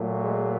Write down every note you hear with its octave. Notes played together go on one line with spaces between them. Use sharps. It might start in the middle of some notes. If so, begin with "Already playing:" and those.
Already playing: A#2 F#3 A3
G#3 G#4